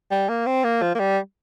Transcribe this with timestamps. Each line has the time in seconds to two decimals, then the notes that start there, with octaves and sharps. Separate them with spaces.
0.11 G3
0.29 A#3
0.46 C4
0.64 A#3
0.82 F3
0.95 A#3
0.99 G3